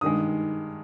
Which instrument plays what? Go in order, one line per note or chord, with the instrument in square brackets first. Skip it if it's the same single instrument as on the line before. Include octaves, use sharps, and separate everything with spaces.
[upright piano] G2 D#3 G#3 D#6